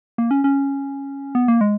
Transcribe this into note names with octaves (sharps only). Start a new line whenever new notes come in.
A#3
C#4
C#4
B3
A#3
G#3